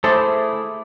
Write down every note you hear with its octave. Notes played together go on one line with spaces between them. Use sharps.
A3 E4 G#4 A4 C5 E5 B5 D6